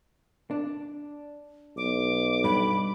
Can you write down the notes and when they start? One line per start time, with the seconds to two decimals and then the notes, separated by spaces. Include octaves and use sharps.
0.51 D4
1.77 B1 D6
2.44 G2 B5